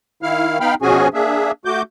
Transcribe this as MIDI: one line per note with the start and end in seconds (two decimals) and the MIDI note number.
0.23 0.58 51
0.23 0.58 64
0.23 0.58 77
0.23 0.58 89
0.60 0.75 59
0.60 0.75 63
0.60 0.75 77
0.60 0.75 79
0.60 0.75 83
0.60 0.75 89
0.82 1.08 47
0.82 1.08 53
0.82 1.08 61
0.82 1.08 66
0.82 1.08 68
0.82 1.08 80
1.14 1.51 58
1.14 1.51 62
1.14 1.51 68
1.14 1.51 76
1.65 1.82 57
1.65 1.82 66
1.65 1.82 86
1.65 1.82 91